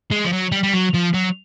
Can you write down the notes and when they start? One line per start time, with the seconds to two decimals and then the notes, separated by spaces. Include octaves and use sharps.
0.12 G#3
0.24 F3
0.32 F#3
0.52 G3
0.63 G3
0.73 F#3
0.94 F3
1.14 F#3